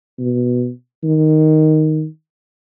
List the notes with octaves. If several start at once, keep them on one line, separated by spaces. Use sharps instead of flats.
B2
D#3